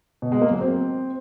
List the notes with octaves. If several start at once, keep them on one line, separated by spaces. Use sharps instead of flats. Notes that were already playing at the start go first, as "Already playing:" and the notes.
B2
G#3
A#3
F#3
C4